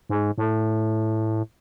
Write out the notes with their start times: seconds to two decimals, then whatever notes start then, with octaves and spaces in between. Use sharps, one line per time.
0.10 G#2
0.38 A2